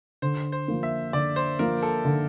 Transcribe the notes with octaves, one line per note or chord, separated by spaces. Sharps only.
D3 C5
C5
F3 A#3
E5
D3 D5
C5
F3 A#3 A#4
A4
D3